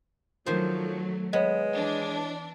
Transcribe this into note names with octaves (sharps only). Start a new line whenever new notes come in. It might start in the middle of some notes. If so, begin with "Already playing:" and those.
D#3 F3 F#3 A3 C5
G#3 B3 C#5 D#5
E3 D4